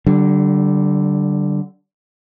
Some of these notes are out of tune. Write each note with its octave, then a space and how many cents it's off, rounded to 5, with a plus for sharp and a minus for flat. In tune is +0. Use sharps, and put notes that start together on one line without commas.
D3 +0 G3 -35